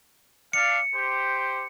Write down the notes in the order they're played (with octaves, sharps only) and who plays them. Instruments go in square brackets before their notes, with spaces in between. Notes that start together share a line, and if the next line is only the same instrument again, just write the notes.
[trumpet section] D4 F5 [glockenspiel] C#7
[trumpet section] G4 C5